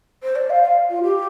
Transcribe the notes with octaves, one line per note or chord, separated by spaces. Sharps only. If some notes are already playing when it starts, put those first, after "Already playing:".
C5
D5
F5
F5
F4
G4